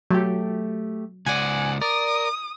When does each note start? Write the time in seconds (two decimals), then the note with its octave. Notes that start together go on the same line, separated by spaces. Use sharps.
0.11 F#3 A3 G4
1.26 C#2 D5 F#5 G#5
1.81 A#4 D5 D#6